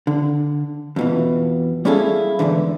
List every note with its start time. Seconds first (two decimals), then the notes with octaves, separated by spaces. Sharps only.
0.07 D3
0.96 F2 B2 E3
1.85 G3 C#4 E4 G#4 A4 F5
2.39 E2 G#2 D3 E3